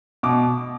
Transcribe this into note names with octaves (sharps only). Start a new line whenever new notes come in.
B2 D6